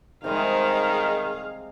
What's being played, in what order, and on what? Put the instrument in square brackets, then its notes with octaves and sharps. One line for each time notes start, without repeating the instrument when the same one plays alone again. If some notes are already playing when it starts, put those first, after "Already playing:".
[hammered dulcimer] C3 G3 G#3 [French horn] D#3 [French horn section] D#4 [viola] G#4 F5